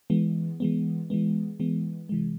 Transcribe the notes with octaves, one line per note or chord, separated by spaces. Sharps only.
E3 G#3 B3
E3 G#3 B3
E3 G#3 B3
E3 G#3 B3
C3 E3 G#3